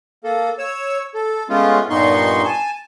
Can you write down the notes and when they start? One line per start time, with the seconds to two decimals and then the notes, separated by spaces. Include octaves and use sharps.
0.24 A#3 A4
0.58 C#5 E6
1.14 A4
1.49 G#3 A3 B3 C#4 F4
1.90 G2 A#2 B3 D#4 C6 C#6
2.45 G#5 A5